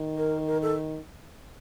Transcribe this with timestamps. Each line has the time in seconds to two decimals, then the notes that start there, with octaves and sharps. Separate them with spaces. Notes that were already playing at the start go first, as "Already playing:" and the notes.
Already playing: D#3
0.17 A#4
0.47 A#4
0.62 A4